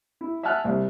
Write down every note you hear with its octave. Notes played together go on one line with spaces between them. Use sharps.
E4
E5 F#5 G#5 A5 F6 F#6
C2